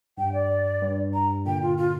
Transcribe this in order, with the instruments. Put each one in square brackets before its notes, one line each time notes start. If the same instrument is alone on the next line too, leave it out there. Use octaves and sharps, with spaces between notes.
[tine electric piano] G2 [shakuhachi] G5
[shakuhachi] D5
[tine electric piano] G2
[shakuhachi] A#5
[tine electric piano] A#2 D3 [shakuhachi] G5
[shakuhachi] F4
F4